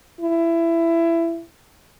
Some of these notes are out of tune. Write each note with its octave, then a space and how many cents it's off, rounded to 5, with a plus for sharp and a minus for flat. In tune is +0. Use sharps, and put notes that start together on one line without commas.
E4 +20